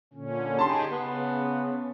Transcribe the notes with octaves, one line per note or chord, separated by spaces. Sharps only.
A#2 D3 C#4
D#4 G4 G#4 A5 B5 C6
C#3 B3